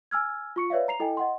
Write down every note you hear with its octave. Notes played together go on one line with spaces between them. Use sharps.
G#5 E6 F6 G#6
F4 C#6 C#7
B4 C#5 D5 E5 F5
A#5 C7 F7
E4 A4 D#5 G5 G#5
D#5 F#5 C6